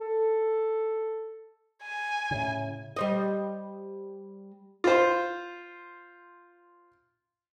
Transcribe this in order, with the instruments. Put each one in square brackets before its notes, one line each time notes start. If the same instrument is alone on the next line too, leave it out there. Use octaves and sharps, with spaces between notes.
[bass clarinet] A4
[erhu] G#5
[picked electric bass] A2 C#3
[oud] G3 C5 D#5
[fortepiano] F4 C5